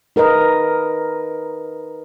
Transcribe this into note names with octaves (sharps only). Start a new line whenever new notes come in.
D#4 A#4 B4 D#5